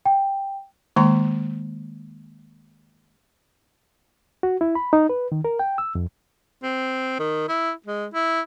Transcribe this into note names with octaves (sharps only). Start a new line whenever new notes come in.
G5
D#3 G#3 A#3 A#5 C6
F#4
E4
B5
D#4
B4
D#3
A#4
G5
E6
F2
C4
D#3
E4
G#3
E4